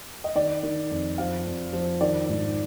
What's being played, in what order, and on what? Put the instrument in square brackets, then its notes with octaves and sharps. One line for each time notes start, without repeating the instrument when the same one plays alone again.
[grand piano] D#5
D#3 D5
D#3
F2
F3 F5
F2
F3
D#3 D5
G#2